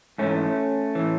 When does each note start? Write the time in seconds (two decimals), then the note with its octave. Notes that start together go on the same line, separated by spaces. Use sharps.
0.18 G#2 E3 A3 C#4
0.95 A2 E3